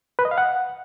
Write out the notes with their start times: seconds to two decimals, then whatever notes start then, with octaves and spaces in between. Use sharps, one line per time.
0.19 B4
0.25 D#5
0.31 F5
0.38 F#5